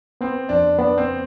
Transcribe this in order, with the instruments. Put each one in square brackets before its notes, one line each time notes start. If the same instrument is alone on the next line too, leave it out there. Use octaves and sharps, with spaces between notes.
[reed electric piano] B3 [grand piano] C4
[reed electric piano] F2 [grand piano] D4
[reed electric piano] B3 [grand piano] D4
[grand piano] C4